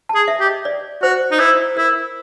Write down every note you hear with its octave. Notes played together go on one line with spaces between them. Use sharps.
A5
G#4
E5
G4
D#5
D5
F#4 C5
D#4
E4 C5
E4 A#4